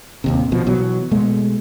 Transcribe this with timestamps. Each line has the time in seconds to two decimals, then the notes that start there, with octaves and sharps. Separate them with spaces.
0.24 D1 D#2 C3
0.52 A#1 B2 F3
0.67 B2 E3 F#3
1.11 B2 G#3 A3